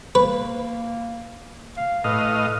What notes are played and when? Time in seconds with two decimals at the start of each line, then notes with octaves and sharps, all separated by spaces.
0.15 A#3 B4
1.77 F5
2.04 A2 B4 D#5 F5